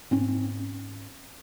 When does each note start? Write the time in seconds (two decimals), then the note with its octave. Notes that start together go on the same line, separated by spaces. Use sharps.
0.11 G#2 C4 C#4